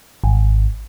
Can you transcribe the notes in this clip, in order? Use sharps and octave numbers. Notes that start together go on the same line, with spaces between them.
G#1